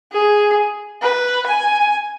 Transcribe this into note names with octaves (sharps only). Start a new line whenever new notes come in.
G#4
B4
G#5